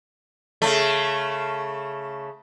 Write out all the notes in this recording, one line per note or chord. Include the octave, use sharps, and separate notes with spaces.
C#3 A3